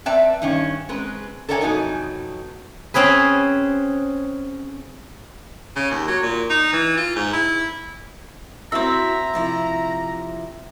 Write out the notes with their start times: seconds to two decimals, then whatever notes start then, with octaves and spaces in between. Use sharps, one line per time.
0.06 C4 B4 D5 E5 G5 A5
0.42 G2 D#3 C#4
0.89 G#3 C4 C#4 B4
1.49 A4 A#4 C#5 D5 E5 G#5
1.61 F2 B2 F#3 D#4 G#5
2.94 C4 C#4 G#4 B4
5.76 C#3
5.91 D#2
6.08 F#3
6.23 A#2
6.50 D#4
6.73 E3
6.97 F4
7.16 G#2
7.33 E4
8.72 C4 E4 F#4 E5 A#5
9.34 C3 F3 E4